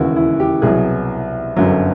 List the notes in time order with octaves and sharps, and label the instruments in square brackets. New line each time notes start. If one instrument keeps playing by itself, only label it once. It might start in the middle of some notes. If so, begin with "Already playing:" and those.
Already playing: [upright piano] E1 D#2 C#3 E3 E4 F#4
E4
G4
C2 B2 F#3 G#4
G1 F#2 D3 F#3